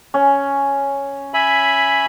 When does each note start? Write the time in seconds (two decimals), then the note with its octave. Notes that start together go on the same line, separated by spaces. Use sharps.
0.14 C#4
1.34 E5 G#5 B5